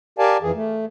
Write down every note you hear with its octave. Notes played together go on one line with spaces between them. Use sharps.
G4 A#4 D5 F5 G#5 A5
F2 E3 G#4
A3